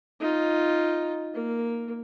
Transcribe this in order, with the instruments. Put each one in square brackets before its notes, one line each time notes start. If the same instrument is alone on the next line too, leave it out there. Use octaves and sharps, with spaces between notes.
[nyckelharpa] D#4 F4
A#3